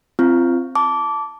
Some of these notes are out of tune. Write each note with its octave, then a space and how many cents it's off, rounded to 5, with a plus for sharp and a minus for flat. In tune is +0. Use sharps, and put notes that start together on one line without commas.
C4 +0 F4 -30
A5 +0 D6 -20